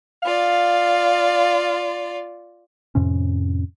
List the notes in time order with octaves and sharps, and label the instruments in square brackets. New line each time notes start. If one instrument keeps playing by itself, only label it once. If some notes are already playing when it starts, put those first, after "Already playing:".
[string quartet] F4 D5 [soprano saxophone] F5
[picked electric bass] F2 A2 C3 C#4